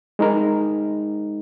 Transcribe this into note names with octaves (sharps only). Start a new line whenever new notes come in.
G#3 D#4 A#4